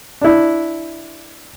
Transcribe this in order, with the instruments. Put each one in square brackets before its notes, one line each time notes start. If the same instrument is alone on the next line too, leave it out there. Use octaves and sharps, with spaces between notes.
[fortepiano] D4 E4